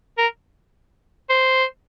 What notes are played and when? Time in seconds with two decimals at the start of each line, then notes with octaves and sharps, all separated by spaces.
0.18 A#4
1.29 C5